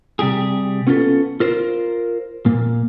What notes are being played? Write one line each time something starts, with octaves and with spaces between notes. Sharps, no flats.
C3 G3 G4 G#4
B3 C#4 F4 G4 A4
F4 A#4 C5
A#2 A#3